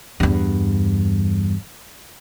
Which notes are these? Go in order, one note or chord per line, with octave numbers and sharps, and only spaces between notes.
E2 G2